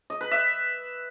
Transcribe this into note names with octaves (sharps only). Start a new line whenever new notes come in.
D#5
B4
E5